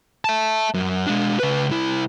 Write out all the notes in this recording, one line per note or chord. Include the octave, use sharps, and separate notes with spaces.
E5 A5
F#2
G#3 D4
C#3 B4
C2 E4